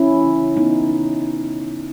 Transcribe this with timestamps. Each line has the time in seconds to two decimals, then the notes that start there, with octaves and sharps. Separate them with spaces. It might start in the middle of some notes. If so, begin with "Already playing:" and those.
Already playing: C#4 E4
0.08 E3
0.25 C#3
0.41 C#3
0.56 C#3 B3 D#4
0.73 C#3